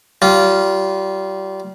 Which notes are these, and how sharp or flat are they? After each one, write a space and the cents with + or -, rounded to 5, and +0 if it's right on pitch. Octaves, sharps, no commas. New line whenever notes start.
G3 -30 F4 -10